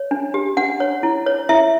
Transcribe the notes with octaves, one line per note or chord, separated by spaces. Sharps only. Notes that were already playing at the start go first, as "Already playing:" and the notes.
Already playing: C#5
D4
G4
D4 F#5
C#5
E4
C#5
E4 E5